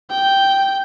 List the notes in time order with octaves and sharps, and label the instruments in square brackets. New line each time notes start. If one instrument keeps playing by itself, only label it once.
[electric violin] G5